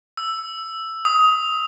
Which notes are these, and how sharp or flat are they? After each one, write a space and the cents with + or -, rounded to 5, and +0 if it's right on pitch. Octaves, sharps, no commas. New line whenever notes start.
E6 +5
D#6 +20